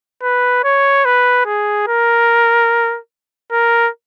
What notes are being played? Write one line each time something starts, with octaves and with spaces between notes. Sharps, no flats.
B4
C#5
B4
G#4
A#4
A#4